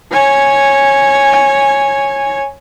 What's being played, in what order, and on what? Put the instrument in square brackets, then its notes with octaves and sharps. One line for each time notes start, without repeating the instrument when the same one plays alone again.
[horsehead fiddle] C#5 G#5